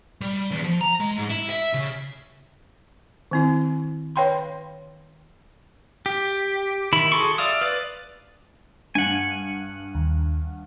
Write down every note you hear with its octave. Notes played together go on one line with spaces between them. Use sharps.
G3
E2
F3
A#5
G#3
G#2
E4
E5
C#3
D#3 C4 E4
B4 C#5 F5 G5 B5 C6
G4
D#3 E4 B5
F#4 G#4 A4 C6 C#6
D5 E5 F5 D#6
B4 D5
G2 F#5 G#5
D#2